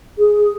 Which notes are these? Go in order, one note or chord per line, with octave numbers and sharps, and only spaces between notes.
G#4